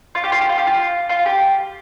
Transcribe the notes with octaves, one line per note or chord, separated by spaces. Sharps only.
F4
G4
F4
G4
F4
G4
F4
F4
G4